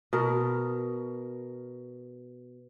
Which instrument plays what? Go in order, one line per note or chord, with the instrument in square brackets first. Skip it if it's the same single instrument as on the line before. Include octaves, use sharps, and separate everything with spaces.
[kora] B2 A#4